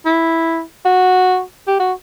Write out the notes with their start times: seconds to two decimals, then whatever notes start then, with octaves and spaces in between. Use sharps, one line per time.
0.05 E4
0.85 F#4
1.67 G4
1.79 F#4